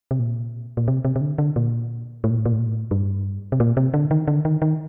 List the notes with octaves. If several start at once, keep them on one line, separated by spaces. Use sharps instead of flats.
C3
A#2
A#2
C3
C3
C3
D3
D3
A#2
A2
A#2
A2
A#2
A2
A#2
A2
G2
C3
A#2
C3
D3
D#3
D3
D#3
D#3